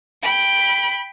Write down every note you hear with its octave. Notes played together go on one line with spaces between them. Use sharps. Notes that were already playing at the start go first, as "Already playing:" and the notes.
G5 B5